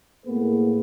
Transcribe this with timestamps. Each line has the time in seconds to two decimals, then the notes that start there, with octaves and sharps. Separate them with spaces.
0.25 A2 A#3 B3 G#4 B4